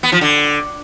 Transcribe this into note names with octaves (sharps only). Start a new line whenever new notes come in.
B3
F3
D3